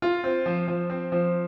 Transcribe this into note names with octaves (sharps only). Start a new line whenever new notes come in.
F4
C4
F3
F3
C4
F3